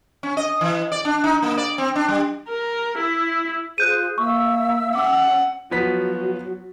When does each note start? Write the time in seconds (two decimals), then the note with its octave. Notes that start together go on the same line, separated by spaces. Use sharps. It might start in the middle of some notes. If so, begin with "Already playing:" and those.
0.23 C#4
0.37 D#5
0.61 E3
0.92 D5
1.05 D4
1.24 D#4
1.42 A#3
1.58 D5
1.78 C4
1.96 D4
2.08 G3
2.48 A#4
2.98 E4
3.78 F4 G#4 C5 F#6 G6 D#7
4.18 A#3 E5 C#6 E6
4.95 C#4 F#5 D6
5.71 F3 F#3 B3 B6